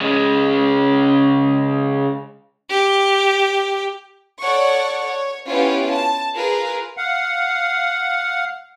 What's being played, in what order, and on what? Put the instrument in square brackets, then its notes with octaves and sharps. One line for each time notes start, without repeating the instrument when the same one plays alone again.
[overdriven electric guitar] C#3 G#3
[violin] G4
[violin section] A4 C#5 D5 F#5 C#6
C#5
B3 C#4 E4 F4 G4
A5
F4 G#4 A#4 B4
[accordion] F5 F#5